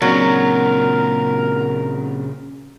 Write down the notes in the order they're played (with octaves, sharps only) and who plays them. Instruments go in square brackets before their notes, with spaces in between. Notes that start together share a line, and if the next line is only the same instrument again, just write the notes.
[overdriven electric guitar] A#2 C#3 [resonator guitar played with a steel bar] F#3 [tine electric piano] A#3 C4 D4 [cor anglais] A#4